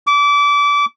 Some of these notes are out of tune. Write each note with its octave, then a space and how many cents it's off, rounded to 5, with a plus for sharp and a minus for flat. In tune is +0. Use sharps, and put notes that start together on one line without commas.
D6 -25